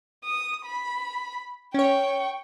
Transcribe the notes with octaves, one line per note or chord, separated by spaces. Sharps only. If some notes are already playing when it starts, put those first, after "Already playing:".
D#6
B5
C#4 C#5 G5 C#6